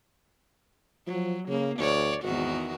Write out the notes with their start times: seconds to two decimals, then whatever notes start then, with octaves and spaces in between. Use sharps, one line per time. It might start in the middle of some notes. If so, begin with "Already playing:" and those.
1.07 F3 F#3
1.49 C#3 A#3
1.79 D2 C#5 D5
2.23 G#1 E2 D#3 F#4